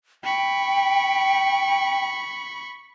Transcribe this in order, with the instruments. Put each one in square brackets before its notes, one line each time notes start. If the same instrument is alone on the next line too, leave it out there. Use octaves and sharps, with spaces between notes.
[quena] G5 [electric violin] B5 C#6